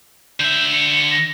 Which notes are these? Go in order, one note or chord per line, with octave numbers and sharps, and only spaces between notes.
D3 E5 G6
C#7
A#6